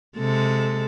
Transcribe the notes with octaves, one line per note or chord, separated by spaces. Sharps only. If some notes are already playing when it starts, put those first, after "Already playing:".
C3 G#3 A4